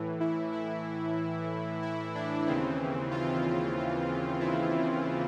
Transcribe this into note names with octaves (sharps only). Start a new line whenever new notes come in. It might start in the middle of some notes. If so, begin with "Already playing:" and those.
Already playing: A2 E3
E4
E4
E4
D4
D#2 C#3 E3 C4
F4
E4